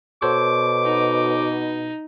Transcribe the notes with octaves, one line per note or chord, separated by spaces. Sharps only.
B2 A4 C5 C#5 D6
D#4